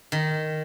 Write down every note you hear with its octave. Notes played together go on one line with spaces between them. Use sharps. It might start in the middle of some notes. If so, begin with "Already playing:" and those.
D#3